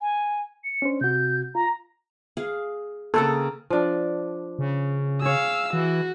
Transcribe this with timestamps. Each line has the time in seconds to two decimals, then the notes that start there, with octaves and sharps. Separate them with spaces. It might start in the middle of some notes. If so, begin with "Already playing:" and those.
0.01 G#5
0.64 C#7
0.82 C#4 D4 C5
1.01 C3 F#4 G6
1.55 F4 A#5
2.37 G#4 F5 G#5
3.14 C#3 A#3 C4 A4
3.70 F3 D4 D5
4.59 C#3
5.22 G#4 C#5 F5 E6
5.73 E3 F#4